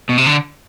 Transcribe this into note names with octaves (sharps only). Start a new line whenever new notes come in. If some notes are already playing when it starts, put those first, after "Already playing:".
B2
C3
D3